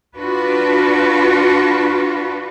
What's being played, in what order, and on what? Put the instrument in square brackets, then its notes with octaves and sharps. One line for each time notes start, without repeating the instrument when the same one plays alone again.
[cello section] D4 F4 F#4 B4